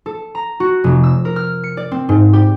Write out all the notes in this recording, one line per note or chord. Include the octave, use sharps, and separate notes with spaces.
A4
A#5
F#4
F1
E6
A#4
F6
C#7
D5
C4
G#2
G4